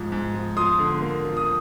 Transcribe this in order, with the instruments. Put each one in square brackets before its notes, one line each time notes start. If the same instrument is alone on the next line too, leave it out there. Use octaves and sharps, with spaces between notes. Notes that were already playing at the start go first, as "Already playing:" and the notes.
Already playing: [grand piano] G#2 F3
G#2
F3
F3 C6 D#6
D3
A#3
F3
D#6